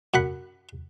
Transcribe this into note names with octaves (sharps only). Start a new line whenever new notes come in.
F#2 F#5 B5